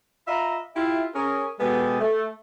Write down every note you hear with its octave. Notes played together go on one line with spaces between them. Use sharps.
F4 D#5 E5 A#5 B5
E4 F4 G4 E5
C#4 G#4 A#4
B2 G#3 B3 G4 A4 G#5
A3